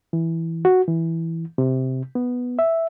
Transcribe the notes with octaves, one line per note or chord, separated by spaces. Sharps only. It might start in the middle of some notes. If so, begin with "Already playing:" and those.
E3
F#4
E3
C3
B3
E5